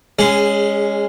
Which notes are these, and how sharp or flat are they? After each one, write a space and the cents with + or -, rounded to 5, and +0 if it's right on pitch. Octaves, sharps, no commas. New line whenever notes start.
G#3 -20 C#4 +0 G#4 +0